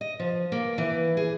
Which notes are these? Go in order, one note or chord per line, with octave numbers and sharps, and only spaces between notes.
D#5
F3
A#3
E3
G#4